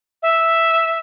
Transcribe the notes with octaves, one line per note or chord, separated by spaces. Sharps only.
E5